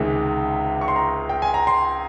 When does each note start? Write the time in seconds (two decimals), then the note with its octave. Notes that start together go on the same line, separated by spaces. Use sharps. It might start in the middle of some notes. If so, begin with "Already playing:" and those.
Already playing: C#2 C3 D#3 G#3
0.81 C#6
0.88 C6
0.96 A#5
1.29 G5
1.42 G#5
1.54 A#5
1.67 C6